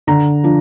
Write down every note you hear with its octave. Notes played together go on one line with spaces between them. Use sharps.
D3 A#5
F3 D4